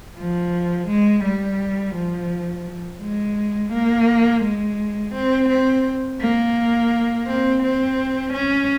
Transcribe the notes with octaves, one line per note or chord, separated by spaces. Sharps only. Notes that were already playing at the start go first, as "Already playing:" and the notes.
F3
G#3
G3
F3
G#3
A#3
G#3
C4
C4
A#3
C4
C4
C#4